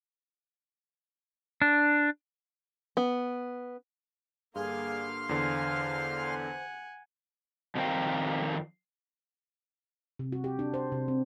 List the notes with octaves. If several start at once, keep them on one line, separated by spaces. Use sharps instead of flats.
D4
B3
G2 D3 A#3 G#4 F5 C6 F6
E2 D3 C5 G#5
F#5 G#5
F2 D#3 C4 A#4 F5 G5
C3
F#4
G4
D4
C5
C3
C4